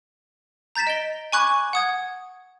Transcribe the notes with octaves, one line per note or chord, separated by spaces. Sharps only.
A#5 G6 A6 B6 E7
D#5 D7 G7
G#5 B5 C#6 D6 F#6 G#6
F#5 D#6 G#6